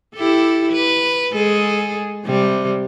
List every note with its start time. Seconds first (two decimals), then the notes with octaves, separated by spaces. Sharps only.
0.16 E4 G4 A4
0.72 B4
1.32 G#3 G#4 A4
2.25 C3 G3